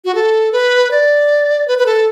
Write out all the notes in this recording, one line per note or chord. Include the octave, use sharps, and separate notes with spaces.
F#4
A4
B4
D5
B4
B4
A4